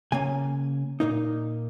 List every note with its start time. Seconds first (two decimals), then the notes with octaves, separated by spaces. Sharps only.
0.12 C#3 A#3 C#4 G#5
1.00 A#2 A#3 D#4